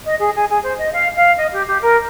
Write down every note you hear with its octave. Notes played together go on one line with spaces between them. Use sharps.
D#5
G#4
G#4
G#4
C5
D#5
F5
F5
D#5
G4
G4
A#4